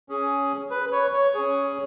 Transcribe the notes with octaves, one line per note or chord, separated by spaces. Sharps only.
C#4 G#4
B4
C#5
C#5
C#4 G#4